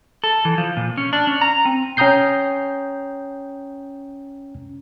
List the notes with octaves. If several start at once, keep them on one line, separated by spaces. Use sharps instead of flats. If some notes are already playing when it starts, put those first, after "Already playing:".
A4
E3
F3
A#2
C#4
D4
C#4
A#5
C4
C#4 G5 A#5 D#6 G6 C7